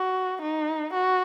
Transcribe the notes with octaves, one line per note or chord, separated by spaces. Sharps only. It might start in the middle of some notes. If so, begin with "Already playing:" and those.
Already playing: F#4
D#4
F#4